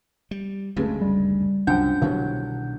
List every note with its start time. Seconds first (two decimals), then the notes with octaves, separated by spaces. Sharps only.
0.31 G3
0.76 F#1 D2 G2 C#3 G#3 A3
1.02 G3
1.67 C2 F#2 F3 D4 F#5 G5 G6
2.02 C2 B2 D3 D#3 F#3